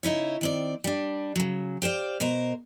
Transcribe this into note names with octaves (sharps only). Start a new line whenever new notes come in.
C#3 D#4 E4 C#5
D#3 C4 D5
G3 D4
C#3 F#3
G4 C5 D5 F5
B2 A#4 C5 A#5